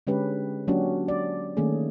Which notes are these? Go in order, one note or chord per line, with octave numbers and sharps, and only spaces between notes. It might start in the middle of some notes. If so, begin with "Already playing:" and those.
D3 G#3 C#4 G4 B4
F#3 A#3 C#4 D4 F#4 G4
D5
D#3 A3 A#3 C#4 G#4